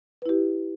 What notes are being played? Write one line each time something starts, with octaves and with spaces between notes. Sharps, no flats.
E4 G4 B4